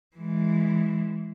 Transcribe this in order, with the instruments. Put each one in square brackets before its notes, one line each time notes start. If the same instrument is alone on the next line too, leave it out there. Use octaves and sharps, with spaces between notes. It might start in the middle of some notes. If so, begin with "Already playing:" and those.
[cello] E3 G#3